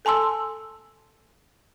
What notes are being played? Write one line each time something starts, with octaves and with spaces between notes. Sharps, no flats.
A4 G#5 A5 C6 E6